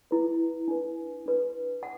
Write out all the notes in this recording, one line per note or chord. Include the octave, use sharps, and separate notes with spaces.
E4 B4
D4 B4
D4 B4
F#5